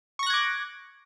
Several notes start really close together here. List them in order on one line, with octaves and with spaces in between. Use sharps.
C#6 A#6 F#6 G#6 D6